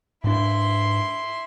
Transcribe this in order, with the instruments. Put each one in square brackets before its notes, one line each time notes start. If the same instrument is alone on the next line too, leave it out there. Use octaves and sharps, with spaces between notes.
[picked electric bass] G#2 D4 [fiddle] E4 C6